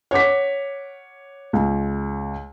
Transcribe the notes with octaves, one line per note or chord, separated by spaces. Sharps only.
C#5 F#5 D6 B6
C#2